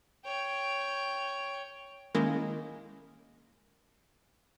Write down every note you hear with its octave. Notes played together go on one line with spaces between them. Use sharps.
C#5 G5
D#3 G#3 A#3 C#4 E4 A#4